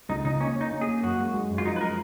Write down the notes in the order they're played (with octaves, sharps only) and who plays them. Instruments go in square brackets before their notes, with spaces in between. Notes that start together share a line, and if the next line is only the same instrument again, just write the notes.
[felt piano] C#2 [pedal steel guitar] D#4
[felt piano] C#3 [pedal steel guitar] D#4
[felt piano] A#3 [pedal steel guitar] C#4
[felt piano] C#4 [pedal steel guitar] D#4
[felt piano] A#3
[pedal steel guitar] G#4
[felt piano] A#3
[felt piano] F#2 [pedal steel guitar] F#4
[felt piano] G#3
G#3
F#2
[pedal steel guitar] F4
[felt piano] F3 [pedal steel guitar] D#4
[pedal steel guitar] B4
[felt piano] G#3 [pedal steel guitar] A#4